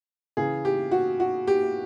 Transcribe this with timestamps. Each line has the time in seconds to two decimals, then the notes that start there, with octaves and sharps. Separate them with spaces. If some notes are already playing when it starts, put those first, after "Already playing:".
0.37 C#3 E3 G#4
0.65 G4
0.91 F#4
1.20 F#4
1.47 G4